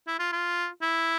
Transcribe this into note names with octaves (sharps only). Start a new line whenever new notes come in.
E4
F4
F4
E4